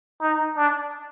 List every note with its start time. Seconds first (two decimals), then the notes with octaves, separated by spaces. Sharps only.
0.22 D#4
0.57 D4